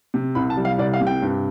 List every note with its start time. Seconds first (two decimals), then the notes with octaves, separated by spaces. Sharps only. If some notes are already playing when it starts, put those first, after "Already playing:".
0.14 C3
0.35 C2 B5
0.50 A5
0.57 G3
0.65 F5
0.78 C2 D5
0.94 F5
1.01 C3
1.07 G5
1.22 G2